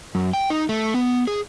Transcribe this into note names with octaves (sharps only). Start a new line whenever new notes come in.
F#2
G5
D#4
A3
B3
G#4